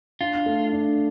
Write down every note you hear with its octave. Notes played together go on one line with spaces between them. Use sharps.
D4 F4
A3
D4